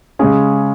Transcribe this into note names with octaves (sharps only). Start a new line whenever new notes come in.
C#3 G#3 C#4 G#4